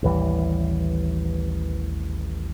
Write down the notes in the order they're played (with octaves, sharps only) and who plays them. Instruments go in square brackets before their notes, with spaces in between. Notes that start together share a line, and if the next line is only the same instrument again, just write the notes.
[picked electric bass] A1 D#2 E3 G3